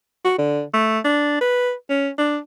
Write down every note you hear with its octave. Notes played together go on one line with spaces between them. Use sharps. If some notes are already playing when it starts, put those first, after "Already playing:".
F#4
D3
A3
D4
B4
C#4
D4